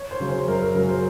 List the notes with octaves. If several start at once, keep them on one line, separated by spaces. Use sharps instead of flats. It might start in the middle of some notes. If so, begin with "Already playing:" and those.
Already playing: C#5
C5
C#3 F#3
C5
F#2 A#4
A#4
C#3 F#3 A#4
C5